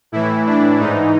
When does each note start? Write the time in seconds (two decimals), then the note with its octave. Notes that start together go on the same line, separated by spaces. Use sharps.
0.12 A2 E3 E4
0.46 D4
0.79 G#2 E3 D#4